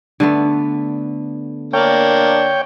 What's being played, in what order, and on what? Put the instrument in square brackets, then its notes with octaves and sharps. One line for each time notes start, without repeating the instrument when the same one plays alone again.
[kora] D3 A3 B3
[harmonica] A#3 D4 [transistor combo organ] C#5 G5